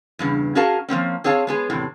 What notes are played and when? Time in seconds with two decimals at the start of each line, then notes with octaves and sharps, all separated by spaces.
0.19 E2 G2 C#3
0.55 C#4 F#4 G#4 A#4 F5 A5
0.89 F3 A#3 C4 C#4
1.24 C4 G#4 C#5 F5 A5
1.47 G#3 B3 G#4
1.70 E2 A2 C3